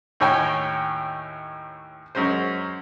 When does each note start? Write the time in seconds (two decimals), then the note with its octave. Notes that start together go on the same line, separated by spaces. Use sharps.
0.20 D#2 A2 C#5 G5 G#5
2.15 F#2 G#3 C#4 C5